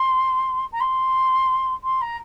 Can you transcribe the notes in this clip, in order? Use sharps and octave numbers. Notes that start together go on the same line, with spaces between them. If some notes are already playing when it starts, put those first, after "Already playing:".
Already playing: C6
A#5
C6
C6
A#5